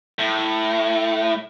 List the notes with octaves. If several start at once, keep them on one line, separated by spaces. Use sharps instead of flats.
A2